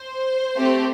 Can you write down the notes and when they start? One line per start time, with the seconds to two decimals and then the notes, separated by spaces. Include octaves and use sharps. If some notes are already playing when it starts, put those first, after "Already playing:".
Already playing: C5
0.57 A3 C4 G4